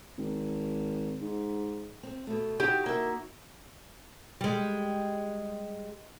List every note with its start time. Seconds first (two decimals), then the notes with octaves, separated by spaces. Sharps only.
0.18 G#1
1.21 G#2
2.03 C4
2.27 B2 A3
2.60 D#4 E4 F#4 G4
2.86 A#3 E5
4.41 G3 G#3